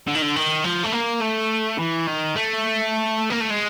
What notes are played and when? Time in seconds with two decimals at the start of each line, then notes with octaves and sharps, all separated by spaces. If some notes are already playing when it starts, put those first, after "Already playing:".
0.07 D3
0.15 D#3
0.22 D3
0.36 D#3
0.64 F3
0.84 A3
0.93 A#3
1.21 A3
1.78 E3
2.07 D#3
2.36 A3
3.30 A#3
3.40 A3
3.50 G#3